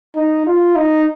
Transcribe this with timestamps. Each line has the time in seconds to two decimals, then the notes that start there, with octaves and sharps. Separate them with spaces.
0.16 D#4
0.47 F4
0.76 D#4